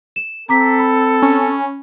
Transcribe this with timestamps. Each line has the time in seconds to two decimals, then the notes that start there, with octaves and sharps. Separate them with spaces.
0.16 E7
0.49 C4 A4 A#5 D6 B6
0.79 B5
1.22 C#4